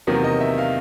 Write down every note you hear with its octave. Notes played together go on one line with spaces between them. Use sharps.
E2 C3 D#3 F#3 A#3
D#5
E5
F5